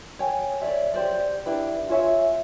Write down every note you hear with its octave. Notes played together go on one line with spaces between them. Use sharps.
C#5 G5 G#5
C#5 D5 E5
G4 C5 D5
D4 E4 G4 B4
F4 G#4 C#5 E5